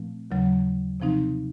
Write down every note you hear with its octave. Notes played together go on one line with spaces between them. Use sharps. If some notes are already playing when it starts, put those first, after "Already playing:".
Already playing: A#2 F3 A3 C4
D#2 C#3 F#3
C3 F3 C4 D#4